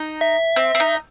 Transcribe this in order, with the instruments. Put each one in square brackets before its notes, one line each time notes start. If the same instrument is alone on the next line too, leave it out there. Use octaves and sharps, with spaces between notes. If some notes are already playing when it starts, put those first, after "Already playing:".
Already playing: [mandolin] D#4
[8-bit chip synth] E5
[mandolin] C4
C4
D#4